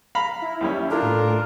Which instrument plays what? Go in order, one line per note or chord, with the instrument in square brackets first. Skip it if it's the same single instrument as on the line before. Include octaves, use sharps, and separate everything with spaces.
[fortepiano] F5 A#5 B5
[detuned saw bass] E4
[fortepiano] D#2 G3 C#4
[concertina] D4 F4 A#4 [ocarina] A4
[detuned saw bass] A2